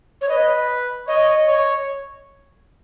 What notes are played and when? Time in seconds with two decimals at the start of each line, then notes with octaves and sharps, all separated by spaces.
0.21 C#5
0.29 B4 D#5
1.08 C#5 D#5
1.47 C#5